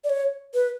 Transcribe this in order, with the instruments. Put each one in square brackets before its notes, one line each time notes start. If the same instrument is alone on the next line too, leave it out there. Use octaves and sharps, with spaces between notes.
[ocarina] D5
C#5
B4